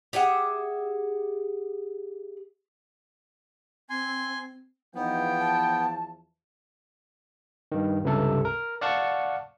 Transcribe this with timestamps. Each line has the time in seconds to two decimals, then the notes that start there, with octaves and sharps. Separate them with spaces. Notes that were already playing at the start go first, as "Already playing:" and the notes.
0.13 G4 G#4 E5 F#5
3.90 C4 G#5 C6
4.95 E2 E3 F3 B3 D#4 G5
5.40 A5
7.72 G2 D#3
8.04 C#2 G2 C3 A4
8.45 A#4
8.81 D5 F5 F#5 A5 C#6